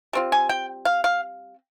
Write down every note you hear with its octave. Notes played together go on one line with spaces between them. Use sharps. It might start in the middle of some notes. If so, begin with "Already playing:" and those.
G3 C4 F4
G#5
G5
F5
F5